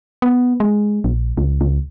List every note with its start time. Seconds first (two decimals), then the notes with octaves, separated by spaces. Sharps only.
0.22 B3
0.60 G#3
1.04 A#1
1.37 C#2
1.61 C#2